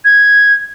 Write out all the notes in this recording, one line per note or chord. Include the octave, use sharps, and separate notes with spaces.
G#6